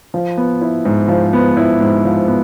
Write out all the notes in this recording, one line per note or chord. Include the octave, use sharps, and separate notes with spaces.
F3
B3
E4
G#2
F3
B3
E4
G#2
F3
B3